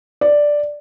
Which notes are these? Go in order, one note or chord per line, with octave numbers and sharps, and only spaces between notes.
D5